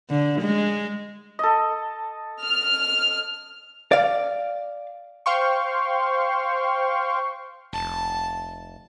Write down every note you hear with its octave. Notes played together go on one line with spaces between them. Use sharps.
D3
G#3
A4 D#5
F6
D5 F5
C5 F5 G5 C6 C#6
F1 A5